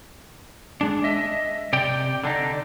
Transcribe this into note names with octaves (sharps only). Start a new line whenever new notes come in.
G#3 D4
D#5 E5
C3 D5 G5
D3 D4 D#4